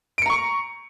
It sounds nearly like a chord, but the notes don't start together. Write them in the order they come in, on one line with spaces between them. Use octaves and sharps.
D7 C#7 A#5 C#6